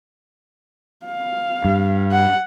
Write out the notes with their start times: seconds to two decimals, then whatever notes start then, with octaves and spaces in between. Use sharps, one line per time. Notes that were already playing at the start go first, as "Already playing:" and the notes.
1.06 F5
1.64 G2
2.12 F#5